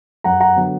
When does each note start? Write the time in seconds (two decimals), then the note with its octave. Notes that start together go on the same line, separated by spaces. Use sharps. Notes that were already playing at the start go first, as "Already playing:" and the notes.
0.24 F#2 F#5 A#5
0.40 F#5 A#5
0.56 D3 F#3 B3